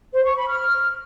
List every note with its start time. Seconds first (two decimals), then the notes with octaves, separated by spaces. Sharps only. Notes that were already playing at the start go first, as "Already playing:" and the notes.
0.13 C5
0.25 C#6
0.37 B5
0.48 F6